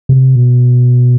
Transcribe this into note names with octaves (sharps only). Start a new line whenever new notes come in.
C3
B2